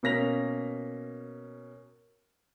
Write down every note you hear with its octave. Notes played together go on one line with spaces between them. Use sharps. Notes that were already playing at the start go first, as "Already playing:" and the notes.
B2 A#3 C#4 A#6 B6 F7